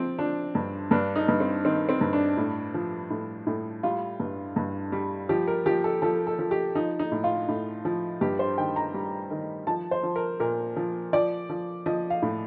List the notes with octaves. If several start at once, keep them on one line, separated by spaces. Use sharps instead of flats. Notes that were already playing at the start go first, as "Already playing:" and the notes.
Already playing: F3 C4
F3 D4
G2
G2 D4
D#4
G2
C4
D#3 C4
C4
G2
D4
A2
F3
A2
A2
G3 F4
G2
G2
G3
F3 G4
A#4
F3 G4
A4
F3 A4
A4
F3
G4
F3 D#4
D#4
A2
F4
A2
F3
G2 G4
C5
D#3 G5
A#5
G3
D#3
F3 A5
C5
F3
A#4
A#2 A#4
F3
F3 D5
F3
F3 D#5
F5
A2